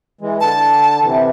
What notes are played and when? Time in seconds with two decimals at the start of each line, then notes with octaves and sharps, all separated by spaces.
0.21 E3 G#3
0.41 D3 A5
1.02 C3 E3